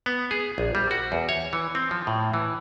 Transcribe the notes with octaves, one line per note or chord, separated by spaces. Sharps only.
B3
G#4
A#1
G3
F#4
E2
C#5
E3
C4
F3
A2
E3